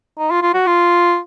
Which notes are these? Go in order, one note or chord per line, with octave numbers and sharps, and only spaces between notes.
D#4
F4
F4
F#4
F4